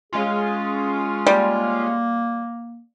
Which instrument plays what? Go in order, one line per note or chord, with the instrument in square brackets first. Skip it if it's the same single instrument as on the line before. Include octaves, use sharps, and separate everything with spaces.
[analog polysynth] G#3 C#4 F4 [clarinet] G#4
[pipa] G3 [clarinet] A#3